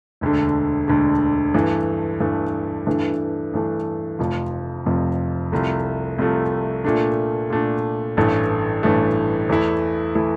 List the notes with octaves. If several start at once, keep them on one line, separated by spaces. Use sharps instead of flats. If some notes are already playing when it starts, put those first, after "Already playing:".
E1 D2 D3
E1 D2 D3
G2 E3 A3
G2 E3 A3
G2 E3 A3 D4
G2 E3 A3 D4
F1 F2 C3 F3
F1 F2 C3 F3
C2 C3 F3 A3
C2 C3 F3 A3
A#2 A3 D4
A#2 A3 D4
A1 G2 E3 A3
A1 G2 E3 A3
E2 E3 A3 E4
E3 A3 E4